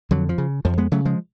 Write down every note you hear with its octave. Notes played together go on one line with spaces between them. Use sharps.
F2 D3 F#3
F3
C#3
F2 F3
G#3 B3
C#3 F#3 A3
F3 G#3